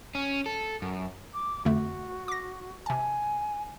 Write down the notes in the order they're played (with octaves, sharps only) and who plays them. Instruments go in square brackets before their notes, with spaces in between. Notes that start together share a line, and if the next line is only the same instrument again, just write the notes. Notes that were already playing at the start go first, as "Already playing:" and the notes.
[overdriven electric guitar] C#4
A4
F#2
[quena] D6
[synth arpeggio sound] F2 D3 A3 [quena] F#4
[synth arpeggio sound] D6 A#6
[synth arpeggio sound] C3 A5 [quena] G#5